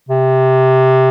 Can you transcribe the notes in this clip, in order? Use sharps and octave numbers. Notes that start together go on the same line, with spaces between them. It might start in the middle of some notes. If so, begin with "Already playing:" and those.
C3